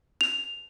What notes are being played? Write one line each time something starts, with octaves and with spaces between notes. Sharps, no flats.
F7